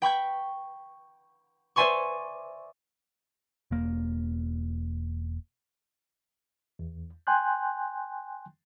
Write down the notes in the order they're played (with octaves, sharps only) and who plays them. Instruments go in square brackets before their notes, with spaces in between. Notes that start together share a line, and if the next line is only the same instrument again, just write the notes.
[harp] G5 B5 C#6 G6
C5 D5 E5 G#5 C6 C#6
[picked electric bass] E1 A#3
[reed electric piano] E2
G5 G#5 C6 F#6 G6